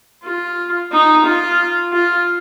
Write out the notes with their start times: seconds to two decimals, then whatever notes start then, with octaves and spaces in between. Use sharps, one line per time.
0.24 F4
0.92 D#4
1.25 F4
1.92 F4